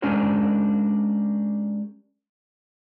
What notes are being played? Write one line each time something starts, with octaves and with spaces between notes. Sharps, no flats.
G#3 C#4 D4 G4 A#4 C5